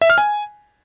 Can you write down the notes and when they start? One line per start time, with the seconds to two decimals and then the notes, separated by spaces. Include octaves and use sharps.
0.01 E5
0.10 F6
0.18 G#5